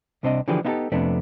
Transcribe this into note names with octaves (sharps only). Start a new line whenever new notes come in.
C2 C3 C4 D4 F#4 D#5
D3 E3 F3 G4 G#4 B4
B3 D#4 E4 F#4 G4 A4
F2 C3 F3 A3 B3 D4